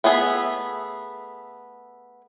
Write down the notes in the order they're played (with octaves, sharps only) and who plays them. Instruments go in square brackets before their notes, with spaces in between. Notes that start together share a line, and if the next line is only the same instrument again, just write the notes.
[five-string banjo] A3 B3 G#4 E5